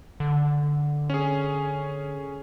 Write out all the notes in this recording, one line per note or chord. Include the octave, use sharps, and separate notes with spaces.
D3
C#4 G#4